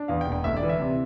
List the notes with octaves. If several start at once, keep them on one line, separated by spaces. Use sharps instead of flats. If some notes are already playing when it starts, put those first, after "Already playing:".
Already playing: D4
E2 F5
G5
E1
G5
D2 E5
D5
E3
E5
C3